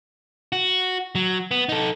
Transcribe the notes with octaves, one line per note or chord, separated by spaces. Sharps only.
F#4
F#3
B3
D#4 A4